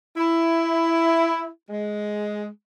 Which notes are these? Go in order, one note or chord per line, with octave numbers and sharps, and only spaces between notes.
E4
G#3